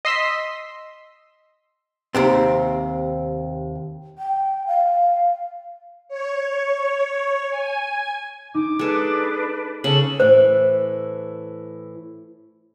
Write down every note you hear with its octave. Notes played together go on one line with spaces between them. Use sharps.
D#5 C6 E6 B6
D#2 C3 C4
G5
F5
C#5
G#5
D#4 D6
G#3 D4 A4 B4
C#3 A4 F#7
A2 E3 C5